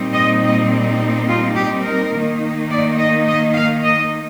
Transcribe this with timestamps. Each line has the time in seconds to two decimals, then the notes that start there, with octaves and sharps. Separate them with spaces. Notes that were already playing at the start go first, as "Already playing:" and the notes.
Already playing: A#2 G3 C4 D#4
0.14 D#5
0.43 D#5
1.27 F4
1.56 G4
1.84 A#4
2.13 D#3 A#3 D#4
2.70 D5
2.98 D#5
3.27 D#5
3.55 F5
3.84 D#5